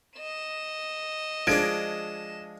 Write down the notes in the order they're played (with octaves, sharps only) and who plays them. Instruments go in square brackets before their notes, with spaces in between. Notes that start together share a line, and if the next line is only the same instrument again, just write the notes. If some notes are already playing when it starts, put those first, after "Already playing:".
[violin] D#5 E7
[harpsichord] F3 G#3 D4 [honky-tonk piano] G#6 A#6 D7